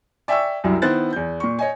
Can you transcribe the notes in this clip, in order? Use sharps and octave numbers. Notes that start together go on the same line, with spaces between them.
D5 E5 G5 G#5 C#6 E6
C2 F#2 F#3 E4
D#3 B3 E4 C5 F#6 A6
E2 G6
A#2 C#6
C#5 D#5 G#5